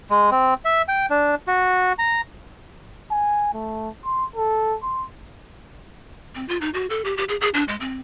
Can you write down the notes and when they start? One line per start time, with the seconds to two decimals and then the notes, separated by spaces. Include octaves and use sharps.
0.10 G#3
0.31 C4
0.65 E5
0.88 G5
1.10 D4
1.47 F#4
1.99 A#5
3.11 G#5
3.54 A3
4.05 C6
4.36 A4
4.83 C6
6.35 C4
6.48 F4
6.61 D#4
6.74 F#4
6.90 A4
7.05 G4
7.17 G4
7.29 G#4
7.41 G#4
7.54 D4
7.68 G#3
7.80 C4